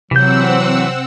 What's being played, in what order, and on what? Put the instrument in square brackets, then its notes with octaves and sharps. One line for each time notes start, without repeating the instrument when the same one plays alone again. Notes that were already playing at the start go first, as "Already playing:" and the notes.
[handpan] C3 [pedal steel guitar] E3 G6 [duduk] F#3 [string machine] C4 F#5 E6